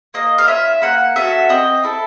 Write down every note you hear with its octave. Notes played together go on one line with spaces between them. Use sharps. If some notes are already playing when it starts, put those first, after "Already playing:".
A#3 D#5
F5
C#4 F4 E5
A#3 F#5
C#4 F#4 A4 E5
C4 D#5
E4 A4